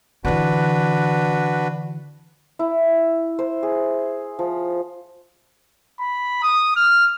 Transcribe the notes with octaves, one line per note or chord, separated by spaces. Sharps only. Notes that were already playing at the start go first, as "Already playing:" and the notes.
D3 E3 D4 F#4 B4
E4
C5
G#4
F3
B5
D#6
F6